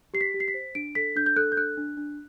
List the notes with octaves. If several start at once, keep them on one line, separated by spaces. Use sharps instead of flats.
G4 C7
B6
G4
C7
B6
C5
D4 D7
A4 B6
D4 G6
G6
A4 F#6
G6
D4 F#6
D4
D4